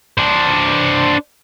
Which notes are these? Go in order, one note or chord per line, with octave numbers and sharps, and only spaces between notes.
D4 C5